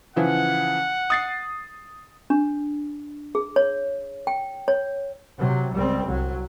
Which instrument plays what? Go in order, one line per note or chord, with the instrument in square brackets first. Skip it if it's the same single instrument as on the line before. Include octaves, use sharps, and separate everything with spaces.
[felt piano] C#3 E3 F3 [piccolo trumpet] F#5
[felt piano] D#6 A6 C7
[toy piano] D4
G#4
C#5
G5
C#5
[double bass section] C3 F#3
C#2 G3 C4
C2 F#3